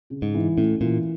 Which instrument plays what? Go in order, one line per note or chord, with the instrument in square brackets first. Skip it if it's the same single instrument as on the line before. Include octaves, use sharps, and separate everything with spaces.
[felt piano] C#3
[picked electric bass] G#2
[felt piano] E3
[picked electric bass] A2 [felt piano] C#4
[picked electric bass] A#2 [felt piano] E3